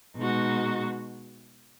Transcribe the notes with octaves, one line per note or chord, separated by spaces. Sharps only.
B2 G#3 D#4 F#4